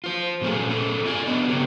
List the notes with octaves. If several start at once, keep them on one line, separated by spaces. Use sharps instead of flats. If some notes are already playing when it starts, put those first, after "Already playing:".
F4 C5
A#2 F#3 A3 C#4 G#4
A3 C#4 E4 G#4 A4
F4 D5 G#5
F#3 B3 D4 D#5
C#3 B3 C4 G4 C#5